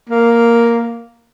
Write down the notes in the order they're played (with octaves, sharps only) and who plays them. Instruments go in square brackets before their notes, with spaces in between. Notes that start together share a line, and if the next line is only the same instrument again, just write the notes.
[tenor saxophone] A#3